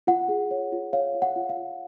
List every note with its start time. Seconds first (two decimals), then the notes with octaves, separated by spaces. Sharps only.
0.07 F4 F#5
0.29 G#4
0.51 C#5
0.72 F4
0.93 C#5 F5
1.15 F4
1.22 F#5
1.36 F4
1.49 F5
1.57 F4